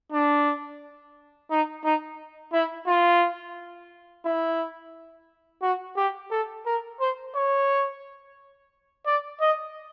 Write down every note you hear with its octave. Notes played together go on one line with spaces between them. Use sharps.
D4
D#4
D#4
E4
F4
E4
F#4
G4
A4
A#4
C5
C#5
D5
D#5